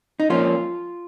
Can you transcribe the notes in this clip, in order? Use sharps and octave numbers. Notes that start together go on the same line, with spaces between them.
D#4
F3 A#3 C#4 F4